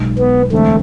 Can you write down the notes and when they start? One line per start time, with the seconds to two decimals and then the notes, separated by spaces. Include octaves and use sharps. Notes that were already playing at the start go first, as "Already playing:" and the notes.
Already playing: B1 B2 G#3
0.19 B3
0.52 E2 D3 G#3 A3 C4